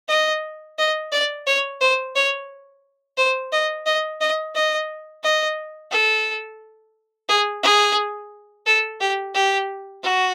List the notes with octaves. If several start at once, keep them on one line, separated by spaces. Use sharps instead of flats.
D#5
D#5
D5
C#5
C5
C#5
C5
D#5
D#5
D#5
D#5
D#5
A4
G#4
G#4
A4
G4
G4
F#4